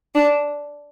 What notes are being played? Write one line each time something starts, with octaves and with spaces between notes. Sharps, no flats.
D4